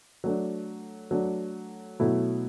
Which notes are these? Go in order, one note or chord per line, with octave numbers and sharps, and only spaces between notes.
F#3 A3 D4
F#3 A3 D4
B2 F#3 A3 E4